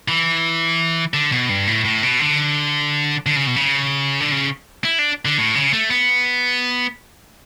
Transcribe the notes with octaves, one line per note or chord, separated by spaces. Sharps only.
E3
D3
B2
G2
A2
A2
B2
D3
D3
C#3
B2
C#3
D3
C#3
E4
D4
D3
A2
C#3
A3
B3